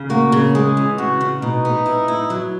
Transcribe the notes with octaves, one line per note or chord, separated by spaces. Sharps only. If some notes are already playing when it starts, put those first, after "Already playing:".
Already playing: C#3
A#3 F#4
C#3
G#3 G#4
E3
C#3 F#4
C#3
B2 D#4
B3
E4
E4
F#3